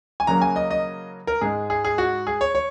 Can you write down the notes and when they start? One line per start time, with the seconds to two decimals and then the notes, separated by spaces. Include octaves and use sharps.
0.20 G#5
0.27 C#3 F#3 A#3 A#5
0.41 G#5
0.56 D#5
0.71 D#5
1.27 A#4
1.41 G#2 G#3 G#4
1.70 G#4
1.84 G#4
1.98 F#4
2.27 G#4
2.41 C#5
2.55 C#5